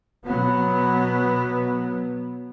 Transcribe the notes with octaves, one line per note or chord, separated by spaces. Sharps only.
B2 F#3 B3